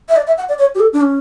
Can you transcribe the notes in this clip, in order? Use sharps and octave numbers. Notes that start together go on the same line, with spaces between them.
E5
D5
E5
F#5
D5
C#5
G4
A4
D4
C#4